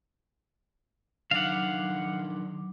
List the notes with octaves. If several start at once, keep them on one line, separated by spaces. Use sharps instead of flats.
D#3 F#3 D4 F5 F#5 D6